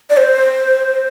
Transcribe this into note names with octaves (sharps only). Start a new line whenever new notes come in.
D5
C5